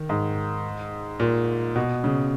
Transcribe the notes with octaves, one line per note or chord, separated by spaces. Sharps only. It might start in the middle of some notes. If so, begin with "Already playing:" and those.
Already playing: D#3
G#2
A#2
B2
C#3